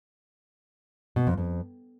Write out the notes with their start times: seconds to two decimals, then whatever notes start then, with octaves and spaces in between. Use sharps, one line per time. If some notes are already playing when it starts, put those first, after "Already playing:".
1.16 B2
1.27 F2
1.38 F2